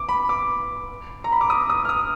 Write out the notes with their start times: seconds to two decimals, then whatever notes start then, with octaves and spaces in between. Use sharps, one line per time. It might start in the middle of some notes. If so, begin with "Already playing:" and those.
Already playing: D6
0.09 B5
0.29 D6
1.24 A#5
1.32 B5
1.41 D6
1.50 D#6
1.70 D#6
1.85 F6
1.89 D#6